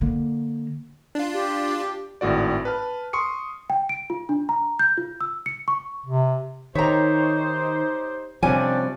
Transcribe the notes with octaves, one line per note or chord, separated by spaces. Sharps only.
D3 A#3
D4 F4
G4
G4
G#1 A2 F#4 D5
B4 A5 F6
C6 C#6 D#6 C#7
G5
D7
F4
D4
A#5
G6
F4
E6
C#7
C#6
C3
D#3 D#4 G4 C5 C#5 E5 A#5
C3 F3 G3 C#4 D4 G4 D5 G#5